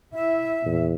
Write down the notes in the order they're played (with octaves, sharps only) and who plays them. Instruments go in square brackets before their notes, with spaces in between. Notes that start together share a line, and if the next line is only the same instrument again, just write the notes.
[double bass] E4 [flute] E5
[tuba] E2 [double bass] A#2